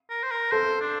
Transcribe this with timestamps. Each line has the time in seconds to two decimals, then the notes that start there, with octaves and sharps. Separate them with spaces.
0.10 A#4
0.23 C5
0.31 A#4
0.51 A4 C5
0.81 D4